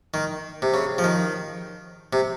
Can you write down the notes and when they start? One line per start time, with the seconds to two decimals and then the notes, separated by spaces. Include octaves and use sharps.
0.14 D#3
0.62 C3
0.74 C#3
0.98 F3
1.04 D#3
2.13 C3